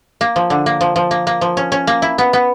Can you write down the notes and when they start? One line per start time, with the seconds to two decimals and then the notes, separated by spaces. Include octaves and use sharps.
0.21 A#3
0.36 F3
0.50 D3
0.66 A#3
0.81 F3
0.96 F3
1.11 A#3
1.27 A#3
1.41 F3
1.57 C#4
1.72 C#4
1.87 A#3
2.02 E4
2.18 B3
2.33 B3